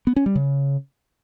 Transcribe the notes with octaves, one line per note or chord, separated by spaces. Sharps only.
B3
C#4
G3
C#3